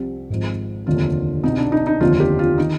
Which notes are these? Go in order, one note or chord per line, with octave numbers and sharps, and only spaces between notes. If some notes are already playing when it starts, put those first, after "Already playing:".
Already playing: C2 C3 F3 G4
G#1 G#2 F3
F1 D#2 D3 F3 F4
C2 B2 D#4
D4
D#4
D#4
F1 D#2 D3 F3 F4
G4
F4
D#3 D#4